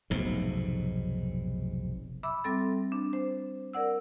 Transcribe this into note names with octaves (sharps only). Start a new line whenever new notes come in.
F1 B1 G#2
E5 B5 D6 E6
G3 C4 A4 A6
D4
C5
A#4 D5 F#5 E6